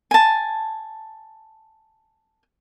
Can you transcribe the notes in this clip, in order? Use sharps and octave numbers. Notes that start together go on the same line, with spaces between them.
G#5 A5